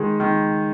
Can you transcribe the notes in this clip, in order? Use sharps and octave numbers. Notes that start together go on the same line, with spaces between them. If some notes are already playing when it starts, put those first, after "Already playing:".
Already playing: D#3 G#3
D#3